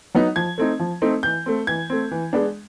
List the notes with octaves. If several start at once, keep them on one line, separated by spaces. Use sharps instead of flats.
F#3 B3 D#4
F3 G#6
A3 C4 D#4
F3
A3 C4 D#4
E3 G6
A3 C4
E3 G#6
A3 C4
E3
G#3 B3 D4